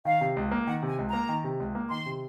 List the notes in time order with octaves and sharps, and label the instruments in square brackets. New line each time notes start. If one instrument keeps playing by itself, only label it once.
[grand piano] D#3 [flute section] F5
[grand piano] C3
C#2
A#3
[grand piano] D#3 [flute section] F#5
[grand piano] C3
[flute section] G#5
[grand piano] C#2
[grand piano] A#3 [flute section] A#5
[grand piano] D#3
C3
C#2
A#3
[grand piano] D#3 [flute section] C6
[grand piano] C3